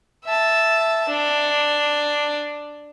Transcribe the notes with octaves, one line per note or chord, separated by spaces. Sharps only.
E5 A5
D4